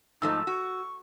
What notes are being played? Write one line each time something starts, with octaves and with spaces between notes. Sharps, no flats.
G#2 F3 A3 D#4 E6
F#4 C#6